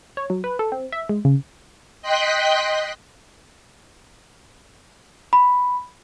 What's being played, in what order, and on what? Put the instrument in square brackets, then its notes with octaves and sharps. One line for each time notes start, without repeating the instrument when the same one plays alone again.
[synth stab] C#5
F#3
B4
A4
C4
E5
G#3
C#3
[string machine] D#5 G5 C6 F#6 B6
[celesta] B5